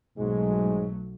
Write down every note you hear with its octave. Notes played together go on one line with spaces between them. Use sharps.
B1 G#2 F#3 G#3 A3